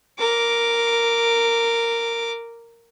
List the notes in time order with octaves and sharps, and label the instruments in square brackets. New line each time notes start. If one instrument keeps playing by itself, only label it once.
[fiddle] A#4 D6